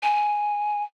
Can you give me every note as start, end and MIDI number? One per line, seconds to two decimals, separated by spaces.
0.03 0.83 80